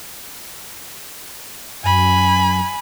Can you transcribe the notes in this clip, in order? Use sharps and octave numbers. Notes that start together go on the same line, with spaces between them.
F#2 G#5 B5